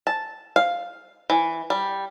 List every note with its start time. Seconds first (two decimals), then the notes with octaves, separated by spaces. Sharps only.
0.07 A5
0.56 F5
1.30 E3
1.70 G3